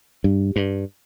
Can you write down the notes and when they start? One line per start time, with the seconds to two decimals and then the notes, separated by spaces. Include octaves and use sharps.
0.24 G2
0.56 G2